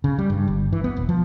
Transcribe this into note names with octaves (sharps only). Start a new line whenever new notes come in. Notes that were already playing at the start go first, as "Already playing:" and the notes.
C#3
G3
G2
G1
E3
B3
E1
F3